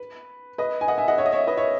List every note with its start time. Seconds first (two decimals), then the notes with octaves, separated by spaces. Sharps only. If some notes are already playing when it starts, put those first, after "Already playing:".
Already playing: B4
0.58 B4 D#5
0.81 G#5
0.88 D#5 F#5
0.98 E5 G#5
1.08 D#5 F#5
1.18 C#5 E5
1.26 D#5
1.32 C#5 E5
1.47 B4 D#5
1.57 C#5 E5